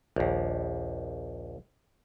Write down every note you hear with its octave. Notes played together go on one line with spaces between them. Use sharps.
A#1 D#2